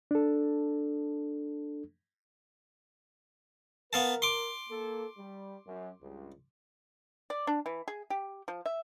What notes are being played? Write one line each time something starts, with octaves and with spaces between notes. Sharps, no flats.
D4 A4
B3 A#4 F5 A5
C6 D6
A#3 A4
G3
F#2
C#2 G2
D5
D4
E3
G#4
G4
F3
E5